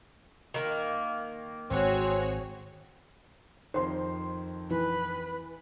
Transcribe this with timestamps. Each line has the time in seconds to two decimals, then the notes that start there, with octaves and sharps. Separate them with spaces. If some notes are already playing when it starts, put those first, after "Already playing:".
0.54 D#3 A#3
1.71 G#1 C4 F#4 G#4 C#5
3.74 F2 D#3 C5 C6
4.70 E3 B4